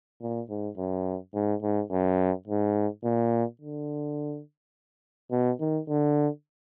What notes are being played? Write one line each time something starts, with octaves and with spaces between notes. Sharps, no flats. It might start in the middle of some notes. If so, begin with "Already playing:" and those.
A#2
G#2
F#2
G#2
G#2
F#2
G#2
A#2
D3
B2
D#3
D3